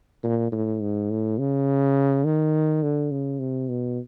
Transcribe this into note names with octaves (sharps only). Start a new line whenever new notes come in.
A#2
A2
G#2
A2
C#3
D#3
D3
C#3
C3
B2